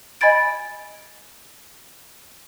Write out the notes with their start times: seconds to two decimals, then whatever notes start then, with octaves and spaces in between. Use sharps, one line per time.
0.21 D#5 G#5 B5 G#6 A6 D7